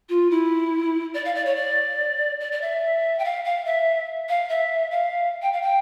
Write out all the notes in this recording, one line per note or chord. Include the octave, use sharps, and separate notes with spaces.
F4
E4
D5
F5
D5
C#5
D5
D5
D5
E5
G5
F5
F5
E5
F5
E5
F5
G5
F5
G5